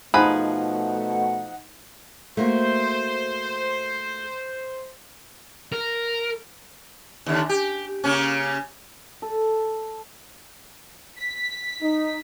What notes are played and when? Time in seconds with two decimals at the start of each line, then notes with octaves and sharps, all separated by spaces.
0.14 B2 F3 A3 D#4 G#4 F#5 B5 F#6
2.37 A3 A#3 F#4 C5
5.72 A#4
7.26 D#2 D3
7.49 G4
8.04 C#3 A#3 C#4
9.22 A4
11.18 B6
11.82 D#4